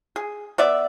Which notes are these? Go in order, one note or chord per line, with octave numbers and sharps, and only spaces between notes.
G#4
B3 D5 E5